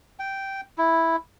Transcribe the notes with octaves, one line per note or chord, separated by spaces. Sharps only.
G5
E4